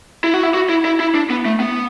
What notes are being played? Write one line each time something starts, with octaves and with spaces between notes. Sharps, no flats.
E4
F#4
E4
F#4
E4
E4
E4
D4
B3
A3
B3